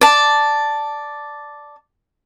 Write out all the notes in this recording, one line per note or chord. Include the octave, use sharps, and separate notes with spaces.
D5 A5